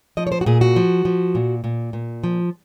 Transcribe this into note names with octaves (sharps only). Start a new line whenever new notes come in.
F3 D#5
C#5
C5
F#4
A#2 G#4
F#4
F3
F3
A#2
A#2
A#2
F3